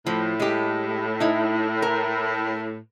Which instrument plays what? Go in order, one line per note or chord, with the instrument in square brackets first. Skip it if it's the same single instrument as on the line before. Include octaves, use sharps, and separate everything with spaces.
[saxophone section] A2 [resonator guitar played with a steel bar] F3
[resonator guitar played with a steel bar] G#3 G4
D#4 E4
A#4